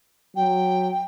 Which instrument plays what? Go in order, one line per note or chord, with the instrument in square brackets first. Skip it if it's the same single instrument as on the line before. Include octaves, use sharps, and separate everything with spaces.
[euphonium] F#3 [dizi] G5